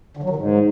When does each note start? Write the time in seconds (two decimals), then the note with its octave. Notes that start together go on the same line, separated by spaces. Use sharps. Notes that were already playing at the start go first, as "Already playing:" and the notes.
0.17 D3
0.23 F#3
0.30 D#3
0.36 G#2